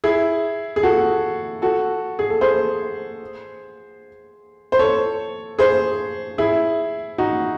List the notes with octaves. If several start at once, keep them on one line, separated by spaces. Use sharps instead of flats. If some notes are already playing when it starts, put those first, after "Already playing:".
E4 G#4
G#4
F#4 A4
F#4 A4
G#4
A4
G#4 C5
C5
A4 C#5
G#4 C5
E4 G#4
D#4 F#4